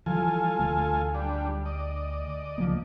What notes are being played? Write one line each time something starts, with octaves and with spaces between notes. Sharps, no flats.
E3 F3 G3 F4 A4 G#5
D2 A3
G3 D4
D5 D#5
C#2 F3 A#3